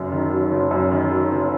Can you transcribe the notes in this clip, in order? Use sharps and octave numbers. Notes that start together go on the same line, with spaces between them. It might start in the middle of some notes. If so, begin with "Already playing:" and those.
Already playing: F#1 F#2
D#3
F#3
F#1
F#2
D#3
F#3
F#1